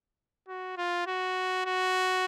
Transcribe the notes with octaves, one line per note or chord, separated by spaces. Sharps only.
F#4
F4
F#4
F#4